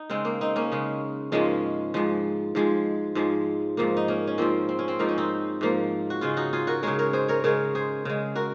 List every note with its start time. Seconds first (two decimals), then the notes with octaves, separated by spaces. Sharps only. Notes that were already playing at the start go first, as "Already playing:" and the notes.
Already playing: D#4
0.10 C#3 G#3 C4
0.25 A#3
0.41 C4 D#4
0.56 A#3 C#4
0.72 C#3 G#3
1.32 G#2 F3 G#3 A#3 C#4
1.94 G#2 F3 G#3
2.55 G#2 F3 G#3
3.15 G#2 F3 G#3
3.77 G#2 F3 A#3
3.97 D#4
4.08 A#3 C#4
4.27 C#4
4.38 G#2 F3 A#3 C4
4.69 C4
4.79 C#4
4.88 C4
4.99 G#2 F3 A#3 D#4
5.09 C#4
5.18 C4 D#4
5.61 G#2 F3 A#3
6.10 F#4
6.21 C#3 G#3 C#4 F4
6.37 D#4 F#4
6.53 F4 G#4
6.67 F#4 A#4
6.83 C#3 G#3 A#4 C#5
6.99 A#4 C#5
7.13 G#4 C5
7.28 A#4 C#5
7.44 C#3 G#3 A#4 C#5
7.75 G#4 C5
8.05 C#3 G#3
8.35 F#4 A#4